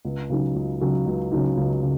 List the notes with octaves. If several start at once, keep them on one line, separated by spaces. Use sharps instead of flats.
C#2
C#3 F#3 D#4
C#2
C#3 F#3 D#4
C#2
C#3 F#3 D#4
C#2
C#3